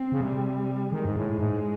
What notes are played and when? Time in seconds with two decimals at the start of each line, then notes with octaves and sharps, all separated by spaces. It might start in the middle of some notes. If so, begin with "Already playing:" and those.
Already playing: C4
0.12 C#3
0.21 C3 G3
0.92 D#3 G#3
1.05 G#2
1.16 A2
1.39 G#2